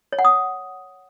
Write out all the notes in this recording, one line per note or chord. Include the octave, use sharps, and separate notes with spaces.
C#5
F#5
D#6